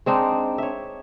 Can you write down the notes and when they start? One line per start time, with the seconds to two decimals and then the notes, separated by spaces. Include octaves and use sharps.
0.06 G#3 C4 D4 D#4
0.58 C#5 E5